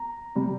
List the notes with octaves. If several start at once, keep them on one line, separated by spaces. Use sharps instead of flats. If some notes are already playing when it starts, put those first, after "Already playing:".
Already playing: A#5
C3 G3